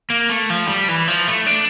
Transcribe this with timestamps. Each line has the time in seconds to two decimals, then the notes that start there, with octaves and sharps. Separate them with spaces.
0.10 A#3
0.29 A3
0.50 F3
0.68 G3
0.89 E3
1.08 F3
1.27 A3
1.46 D4